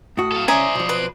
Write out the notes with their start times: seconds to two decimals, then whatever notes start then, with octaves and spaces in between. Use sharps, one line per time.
0.17 A2 F#4 D#6
0.32 A4 F5
0.48 C#3 C#4 C5 D5 E5 G#5 A#5 D#6
0.75 B1 F3
0.89 B4